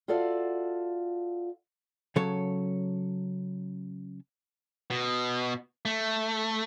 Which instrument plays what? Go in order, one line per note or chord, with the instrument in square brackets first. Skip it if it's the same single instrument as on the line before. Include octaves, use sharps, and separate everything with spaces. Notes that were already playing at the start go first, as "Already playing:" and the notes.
[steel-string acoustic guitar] F4 F#4 A4 D5 E5 F5
[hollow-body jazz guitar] C#3 F#3 A4 C#5
[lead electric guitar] B2
A3